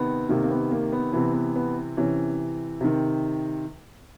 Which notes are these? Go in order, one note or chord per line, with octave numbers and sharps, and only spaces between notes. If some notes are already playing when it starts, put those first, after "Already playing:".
Already playing: C3 D#3 B3
C3 D#3 A#3
A#3
B3
A#3
B3
C3 E3 B3
B3
B3
C3 E3 C#4
C3 D#3